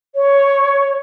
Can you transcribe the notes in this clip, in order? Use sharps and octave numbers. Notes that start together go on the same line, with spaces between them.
C#5